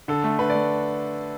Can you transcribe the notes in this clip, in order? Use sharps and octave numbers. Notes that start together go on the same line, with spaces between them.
D3 A4
A3
D3 B4
D5
A3